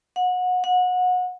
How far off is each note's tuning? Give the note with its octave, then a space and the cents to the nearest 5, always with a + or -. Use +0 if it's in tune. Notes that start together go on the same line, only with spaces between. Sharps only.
F#5 -25
F#5 -25